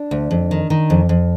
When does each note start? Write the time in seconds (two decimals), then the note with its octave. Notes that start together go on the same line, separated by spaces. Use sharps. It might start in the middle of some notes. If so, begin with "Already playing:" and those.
Already playing: D4
0.11 D2
0.31 F2
0.51 D#3
0.70 D#3
0.90 F2
1.09 F2